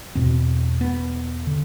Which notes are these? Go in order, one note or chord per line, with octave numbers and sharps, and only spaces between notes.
E2 B2 C4
B3
D3